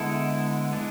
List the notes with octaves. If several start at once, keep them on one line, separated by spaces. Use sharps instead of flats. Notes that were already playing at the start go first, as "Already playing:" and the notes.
Already playing: D3 G#3 B3 E4 A4
G#3 B3 D4